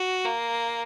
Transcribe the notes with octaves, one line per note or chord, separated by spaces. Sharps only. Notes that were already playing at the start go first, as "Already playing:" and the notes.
Already playing: F#4
A#3